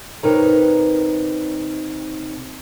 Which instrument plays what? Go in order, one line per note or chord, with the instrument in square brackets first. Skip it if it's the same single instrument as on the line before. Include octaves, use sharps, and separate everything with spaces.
[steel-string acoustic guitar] C3 D#4 A#4 B4 C#5 A#5